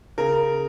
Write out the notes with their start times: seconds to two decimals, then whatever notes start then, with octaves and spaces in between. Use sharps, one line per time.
0.18 C#3 A#4